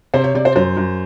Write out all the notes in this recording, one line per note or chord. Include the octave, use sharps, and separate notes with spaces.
C3 C5
C#5
C3 D5
C5
F#2 C5
F#2